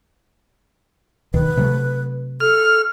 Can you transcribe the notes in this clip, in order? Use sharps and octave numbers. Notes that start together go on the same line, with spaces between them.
D2 B2 D#3 B4
C3 F#3 A3
A4 F6